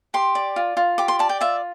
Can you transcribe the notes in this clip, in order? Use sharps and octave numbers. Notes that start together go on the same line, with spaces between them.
G4 C6
D5
F4
F4
G4 D6
C6
D5 A5
G5
F4 E5